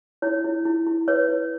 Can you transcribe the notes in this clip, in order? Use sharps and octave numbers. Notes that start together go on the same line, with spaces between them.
E4 C#5
E4
E4
E4
B4 C#5
E4